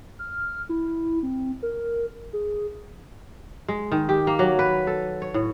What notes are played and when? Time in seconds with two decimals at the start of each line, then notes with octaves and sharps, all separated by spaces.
0.19 F6
0.69 E4
1.23 C4
1.63 A#4
2.33 G#4
3.68 G#3
3.92 D#3
4.09 G4
4.27 A#3
4.39 F#3
4.59 B4
4.87 A4
5.22 C#5
5.34 A2